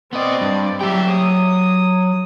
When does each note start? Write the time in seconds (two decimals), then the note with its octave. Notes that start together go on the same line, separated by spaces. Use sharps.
0.13 B3 C4 D5 D#5
0.41 G2
0.81 F#3 G4 E5 G5
1.11 D#6